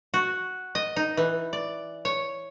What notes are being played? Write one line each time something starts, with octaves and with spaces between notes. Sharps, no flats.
F#4
D#5
D#4
E3
D5
C#5